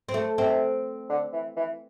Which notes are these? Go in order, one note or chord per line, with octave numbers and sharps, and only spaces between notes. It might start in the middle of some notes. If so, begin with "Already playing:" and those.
C4
A3
C3 C4
D3
E3
E3